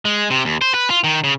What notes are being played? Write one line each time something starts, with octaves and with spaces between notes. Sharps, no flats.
G#3
C3
D#2
C5
B4
F4
D#3
C#3